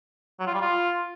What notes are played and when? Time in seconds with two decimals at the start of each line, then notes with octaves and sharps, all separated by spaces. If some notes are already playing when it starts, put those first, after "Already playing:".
0.39 F#3
0.47 F4
0.54 G3
0.61 F4